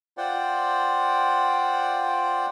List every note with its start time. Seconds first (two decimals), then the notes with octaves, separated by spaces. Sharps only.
0.18 F4 C5 D5 F#5 G5